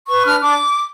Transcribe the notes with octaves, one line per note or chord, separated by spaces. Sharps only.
B4 C#6
D4 F6
D4 D6